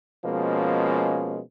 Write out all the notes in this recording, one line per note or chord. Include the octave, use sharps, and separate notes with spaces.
B2 F3 G#3 A#3 C#4